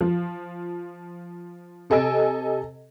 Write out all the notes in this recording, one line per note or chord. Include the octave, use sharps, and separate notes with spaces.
F3
C3 A4 D#5 G#5 E6 D7